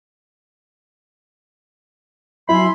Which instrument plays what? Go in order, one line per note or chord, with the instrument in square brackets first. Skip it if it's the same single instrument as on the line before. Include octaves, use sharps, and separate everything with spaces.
[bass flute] F#3 [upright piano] E4 [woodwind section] E5 G#5 C6 [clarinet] B5